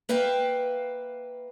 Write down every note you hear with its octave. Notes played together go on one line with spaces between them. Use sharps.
A#3 B4 E5 F5 G5